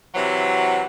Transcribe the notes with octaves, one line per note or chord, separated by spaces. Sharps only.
C3 E3 F#3